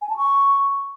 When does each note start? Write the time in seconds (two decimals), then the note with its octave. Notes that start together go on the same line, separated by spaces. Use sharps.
0.02 G#5
0.09 A5
0.17 C#6